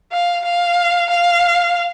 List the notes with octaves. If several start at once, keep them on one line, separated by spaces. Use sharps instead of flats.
F5
F5
F5